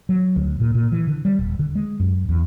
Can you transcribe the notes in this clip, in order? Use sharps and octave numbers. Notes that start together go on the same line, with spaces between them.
F#3
D2
A#2
A#2
E3
D3
G3
D#1
D3
G#3
F#2
E2